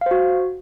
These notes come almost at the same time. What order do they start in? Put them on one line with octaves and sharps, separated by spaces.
F5 C5 F#4